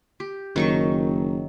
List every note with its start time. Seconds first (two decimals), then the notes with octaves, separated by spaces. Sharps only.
0.20 G4
0.56 F#1 D#3 F#3 C#6